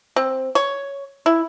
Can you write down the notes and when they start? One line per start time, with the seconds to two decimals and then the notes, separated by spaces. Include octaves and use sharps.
0.16 C4
0.55 C#5
1.26 E4